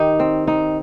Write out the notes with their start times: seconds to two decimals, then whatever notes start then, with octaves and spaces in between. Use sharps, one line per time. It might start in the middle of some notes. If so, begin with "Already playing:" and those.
Already playing: D#3 D#4 G4
0.20 C4
0.47 D#4